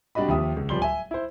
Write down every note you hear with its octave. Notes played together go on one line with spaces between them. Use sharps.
C3 G3 D4 F#4 D#5 B5
D#2 F3 G4 E5 D#6
C#2
D1 F3 G3 C6 G7
E5 G#5
E4 C5